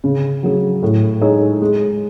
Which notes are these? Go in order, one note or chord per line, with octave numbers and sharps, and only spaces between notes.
C#3
F#3 C#4 G#4
A2
G#3 D#4 G#4 C#5
G#3